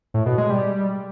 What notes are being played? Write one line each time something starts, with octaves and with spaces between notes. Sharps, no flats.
A2
B2
G#3
G3